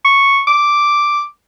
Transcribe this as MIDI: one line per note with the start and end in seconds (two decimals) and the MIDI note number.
0.05 0.41 85
0.47 1.22 86